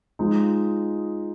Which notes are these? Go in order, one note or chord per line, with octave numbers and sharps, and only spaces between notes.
F3 G#3 D#4